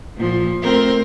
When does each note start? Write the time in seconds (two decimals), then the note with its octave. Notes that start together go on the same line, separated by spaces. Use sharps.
0.16 A#2 F3
0.62 A3 C4 A#4